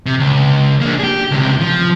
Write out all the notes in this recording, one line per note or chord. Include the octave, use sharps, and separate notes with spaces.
C3
C#2
A#3 D4
G4 G#4
C#2 C3
F3